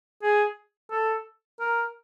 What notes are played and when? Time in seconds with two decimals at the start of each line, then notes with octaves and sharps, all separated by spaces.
0.23 G#4
0.91 A4
1.60 A#4